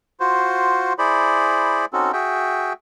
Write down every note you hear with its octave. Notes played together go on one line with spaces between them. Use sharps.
F4 F#4 C5
E4 G#4 C5 D5 B5
C4 C#4 D#4 F#4 A4
F#4 G#4 E5 G5